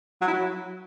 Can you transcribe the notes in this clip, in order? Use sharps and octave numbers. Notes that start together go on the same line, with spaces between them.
F#3
E4
F#3